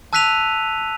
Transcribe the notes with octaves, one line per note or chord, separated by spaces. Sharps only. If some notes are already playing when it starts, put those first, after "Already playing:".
A5 E6 F#6 B6 D#7 F7